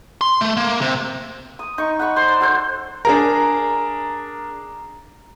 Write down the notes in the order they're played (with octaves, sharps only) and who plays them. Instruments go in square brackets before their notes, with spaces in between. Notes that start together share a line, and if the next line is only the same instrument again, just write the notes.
[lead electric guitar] C6
A3
A#3
C3
[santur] D#6
D#4 C#6
F#5 B5 C#6
C5 C6
D5
F#4 A4 C5
[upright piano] D4 G#4 A#4 [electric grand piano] A#5